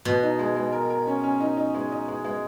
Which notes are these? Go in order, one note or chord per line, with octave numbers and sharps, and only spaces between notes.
B2 B3
D#4
G#3
G#3
A#4
A#4
C#4
C#4
D#4
D#4
G#3
D#4
G#3
G#3